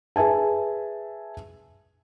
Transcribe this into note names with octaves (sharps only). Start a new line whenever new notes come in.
G#4 B4 E5 G#5 A5